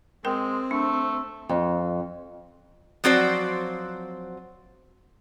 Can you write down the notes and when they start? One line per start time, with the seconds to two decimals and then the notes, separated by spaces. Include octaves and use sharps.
0.25 G#3 C4 A#4 G5
0.71 A3 D4
1.49 F2
3.04 F3 F#3 C4 F#4 C5 D5